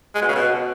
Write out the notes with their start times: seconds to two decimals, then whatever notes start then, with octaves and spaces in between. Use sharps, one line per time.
0.15 G#3
0.22 B2
0.28 C#3
0.35 B2